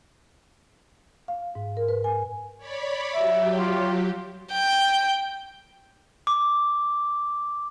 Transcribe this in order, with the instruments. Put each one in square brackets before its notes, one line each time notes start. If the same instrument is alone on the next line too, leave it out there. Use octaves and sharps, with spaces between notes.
[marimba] F5
G#2
A#4
B4
G#5
[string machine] C#5 D5 B5
[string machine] F#3 G4 [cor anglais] E5
[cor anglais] F4
[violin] G5
[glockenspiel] D6